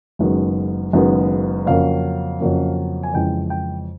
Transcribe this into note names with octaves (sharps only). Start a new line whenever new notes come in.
F#1 F#2 D#3 G#3 B3
F#1 F#2 D#3 G#3 B3
F2 C#3 F#3 A#3 F5
F2 C#3 F#3 A#3
G#5
F2 C#3 E3 G#3 G5
G5